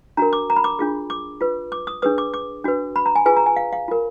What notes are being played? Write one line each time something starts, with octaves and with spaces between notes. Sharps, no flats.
D4 F#4 A#4 A#5
D6
A#5
B5
D6
D4 F4 G#4
D6
F4 B4
D6
D#6
D4 G#4 B4 D#6
D6
D6
D4 F#4 B4
B5
A#5
G#5
F4 G#4 B4 G#5
A#5
G#5
F5
F5
F4 A#4